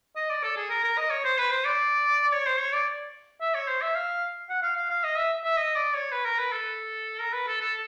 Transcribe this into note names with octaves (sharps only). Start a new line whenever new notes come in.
D#5
D5
A4
G#4
A#4
A#4
D#5
C#5
C5
B4
C5
D5
C#5
C5
C#5
D5
E5
C#5
C5
E5
F5
F#5
F5
F5
F5
D#5
E5
E5
D#5
D5
C#5
B4
A#4
B4
A4
A#4
B4
A4
A4